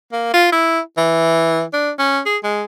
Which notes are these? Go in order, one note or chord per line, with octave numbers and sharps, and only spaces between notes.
A#3
F4
E4
E3
D4
C#4
G#4
G#3